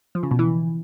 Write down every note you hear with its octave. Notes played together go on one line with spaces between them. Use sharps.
F3
C#3
B2
E3